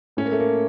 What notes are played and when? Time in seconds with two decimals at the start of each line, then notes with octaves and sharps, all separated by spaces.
0.17 A2 C#4
0.25 A#3
0.32 A3
0.40 A#3